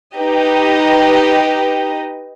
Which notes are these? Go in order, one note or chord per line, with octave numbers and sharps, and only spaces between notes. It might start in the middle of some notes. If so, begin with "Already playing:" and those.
D#4 G4 B4 D#5